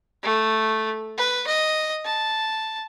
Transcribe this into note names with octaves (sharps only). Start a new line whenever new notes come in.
A3
B4
D#5
A5